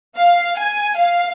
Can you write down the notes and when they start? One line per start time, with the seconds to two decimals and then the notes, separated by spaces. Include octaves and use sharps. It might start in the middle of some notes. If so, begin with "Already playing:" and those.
0.17 F5
0.58 G#5
0.98 F5